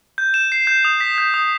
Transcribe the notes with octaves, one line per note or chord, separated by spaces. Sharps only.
G6
E7
C7
G6
D#6
B6
G6
D#6